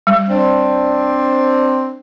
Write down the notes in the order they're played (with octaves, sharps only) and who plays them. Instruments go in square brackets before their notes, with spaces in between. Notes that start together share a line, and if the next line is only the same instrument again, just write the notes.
[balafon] G3
[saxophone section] C4 D4